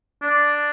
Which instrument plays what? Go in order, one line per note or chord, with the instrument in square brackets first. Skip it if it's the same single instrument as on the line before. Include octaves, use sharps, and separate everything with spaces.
[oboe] D4